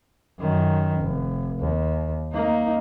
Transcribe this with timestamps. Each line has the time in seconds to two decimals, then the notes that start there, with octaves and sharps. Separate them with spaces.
0.40 F#2 D#3
0.99 F1
1.61 D#2
2.34 A#3 D#4